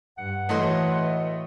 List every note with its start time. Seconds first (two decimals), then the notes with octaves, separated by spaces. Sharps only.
0.18 G2 F#5
0.49 A2 E3 A3 F#4 D#5 C6